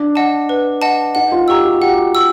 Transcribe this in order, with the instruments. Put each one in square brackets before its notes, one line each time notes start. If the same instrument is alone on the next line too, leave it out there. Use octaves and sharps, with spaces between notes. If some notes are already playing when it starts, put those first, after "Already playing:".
Already playing: [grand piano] D4
[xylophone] D#5 F#5 A5
B4
D#5 F#5 A5
[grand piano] D#4 [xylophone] F#5
[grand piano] F4
[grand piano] G4 [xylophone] A#5 C#6 E6
[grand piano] F#4
[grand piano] G4 [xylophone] F#5
[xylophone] C#6 E6